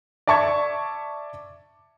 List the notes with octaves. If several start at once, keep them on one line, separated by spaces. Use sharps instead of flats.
D5 E5 A5 C#6 D6 G#6